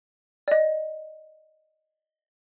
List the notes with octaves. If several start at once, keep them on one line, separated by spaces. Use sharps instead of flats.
D5 D#5